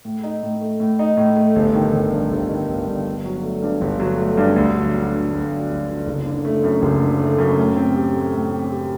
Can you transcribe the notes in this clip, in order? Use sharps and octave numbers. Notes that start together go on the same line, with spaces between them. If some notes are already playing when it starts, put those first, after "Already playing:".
A2
D#4
A2
A3
A2
D#4
A2
A3
G1
D#3
G1
G2
G1
D#3
G1
G2
G1
F#3
A3
G2
G1
F#3
A3
G2
D2
F#3
D2
D3
D2
F#3
D2
D3
F#1
D3
A3
F#2
F#1
D3
A3
F#2
A2
C4
G4
A3
A2
C4
G4